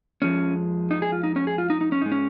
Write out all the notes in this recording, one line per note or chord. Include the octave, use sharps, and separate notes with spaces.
F2 F3 G#3 C#4
D#4
G#4
F4
D#4
C#4
G#4
F4
D#4
D#4
C#4
G#2 G#3 D#4
C#4